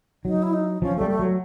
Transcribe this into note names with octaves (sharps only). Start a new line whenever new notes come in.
F#3 D#4
E4
D#4
F3 C#4
A3
G3
A3
F#3